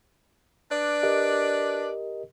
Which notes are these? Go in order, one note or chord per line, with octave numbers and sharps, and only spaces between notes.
D4 B4 D5
G4 A#4 D#5